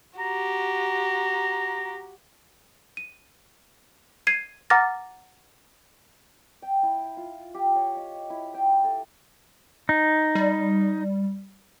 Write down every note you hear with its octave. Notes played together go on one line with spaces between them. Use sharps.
F#4 G4 A#5
D#7
G#6 C7 D#7
F#5 A#5 D6 F6 A6 A#6
G5
E4
F4
G4
C#5
D#5
E4
G5
A4
D#4
G3